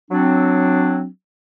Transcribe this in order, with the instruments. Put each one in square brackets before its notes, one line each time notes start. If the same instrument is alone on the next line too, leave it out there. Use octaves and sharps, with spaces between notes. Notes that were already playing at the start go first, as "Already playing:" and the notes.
[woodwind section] F#3 C4 D4